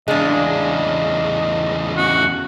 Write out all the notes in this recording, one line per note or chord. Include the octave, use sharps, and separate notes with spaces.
E2 C#3 G#3 D4 D#5
C#4 F#4